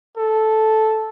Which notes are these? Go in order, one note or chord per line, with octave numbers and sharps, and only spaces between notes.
A4